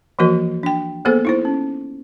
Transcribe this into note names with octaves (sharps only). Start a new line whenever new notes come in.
E3 F3 A#3 F#4 A#4 D#5
D4 G5
A#3 B3 G#4 A4 C5
D#4 E4 C5
C#4